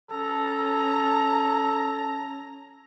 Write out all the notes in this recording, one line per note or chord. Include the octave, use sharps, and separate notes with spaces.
C#4 A4 A#5